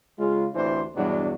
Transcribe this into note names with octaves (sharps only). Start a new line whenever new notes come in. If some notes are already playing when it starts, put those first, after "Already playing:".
C#3 G#3 F4
A1 D2 E3 C4 D4 C5
E2 G2 B2 F#3 G3 D4